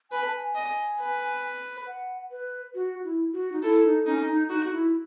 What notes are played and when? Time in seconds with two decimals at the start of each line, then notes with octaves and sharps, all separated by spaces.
0.11 B4 G#5
0.23 A5
0.36 G#5
0.55 D#5
1.00 B4
1.87 F#5
2.31 B4
2.75 F#4
3.04 E4
3.32 F#4
3.52 D#4
3.62 E4 A4
3.84 D#4
4.06 C#4 D#4
4.28 D#4
4.49 D#4 F#4
4.72 E4